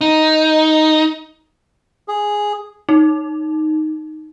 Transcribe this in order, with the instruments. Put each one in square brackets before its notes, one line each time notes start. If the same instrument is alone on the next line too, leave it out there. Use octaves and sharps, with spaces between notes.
[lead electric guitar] D#4
[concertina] G#4
[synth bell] D#4